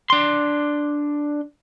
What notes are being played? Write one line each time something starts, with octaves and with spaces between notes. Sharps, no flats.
D4 C6